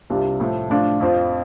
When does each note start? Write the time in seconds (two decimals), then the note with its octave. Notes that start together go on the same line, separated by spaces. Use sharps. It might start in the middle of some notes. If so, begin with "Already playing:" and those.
0.10 C2 C3 G3 D4 F4
0.40 A2 F3 A3
0.70 A2 F3 D4 F4
1.00 F2 F3 C4 F4